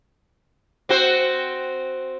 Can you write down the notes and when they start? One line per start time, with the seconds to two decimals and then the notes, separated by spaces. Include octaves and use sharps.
0.89 C4 F#4 C5